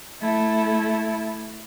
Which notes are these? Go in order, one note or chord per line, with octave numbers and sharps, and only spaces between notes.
A3 E4